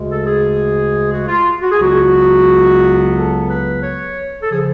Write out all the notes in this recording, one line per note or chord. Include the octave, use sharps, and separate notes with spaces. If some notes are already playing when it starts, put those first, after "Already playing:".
Already playing: D2 C#3 G#3
A4
G#4
F#4
F4
F#4
G#4
C#2 C#3 F#3 B3 F#4
A4
B4
C#5
A4
C#3 F3 G#4